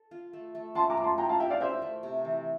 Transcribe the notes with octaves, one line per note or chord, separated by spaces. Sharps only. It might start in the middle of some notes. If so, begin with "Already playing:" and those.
Already playing: A4
F4
A3
A3
F3 A5 C6
A#5 D6
F3
A5 C6
E4 G5 A#5
F5 A5
G4 E5 G5
D5 F5
A#4 C5 E5
A3
C3
E3